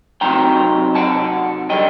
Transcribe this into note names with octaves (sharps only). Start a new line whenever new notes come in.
C3 F#3 C4 D#4 G5 A#5
F#5 A5
D3 G3 D#5 G5